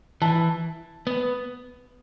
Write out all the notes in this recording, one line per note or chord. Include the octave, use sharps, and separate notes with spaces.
E3 A5
B3